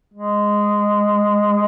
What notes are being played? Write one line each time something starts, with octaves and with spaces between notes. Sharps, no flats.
G#3